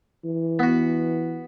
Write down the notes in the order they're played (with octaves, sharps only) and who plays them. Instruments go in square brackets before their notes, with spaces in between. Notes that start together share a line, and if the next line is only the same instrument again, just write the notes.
[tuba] E3
[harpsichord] B3 F#4